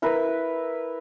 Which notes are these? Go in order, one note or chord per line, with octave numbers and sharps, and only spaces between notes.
E4 A#4 B4